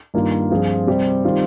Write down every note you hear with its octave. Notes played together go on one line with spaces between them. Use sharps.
G2 D#3 A#3 F4
G2 F3 C4 F4 G#4
C3 G3 C4 G4
D#3 G3 C4 F4